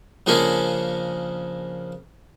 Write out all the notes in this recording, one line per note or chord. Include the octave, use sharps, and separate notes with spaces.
C#3 F3 A#3 C#4 D4